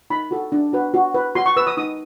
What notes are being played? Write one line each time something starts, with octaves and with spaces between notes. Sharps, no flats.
D#4 B5
F#4 A4
D4
F#4 B4
F#4
B4
F#4 C6
C#6
B4 E6
D#6
D#4 D#6